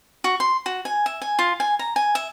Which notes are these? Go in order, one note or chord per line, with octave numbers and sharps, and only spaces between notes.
F#4
C6
F#4
G#5
E5
G#5
F4
G#5
A#5
G#5
E5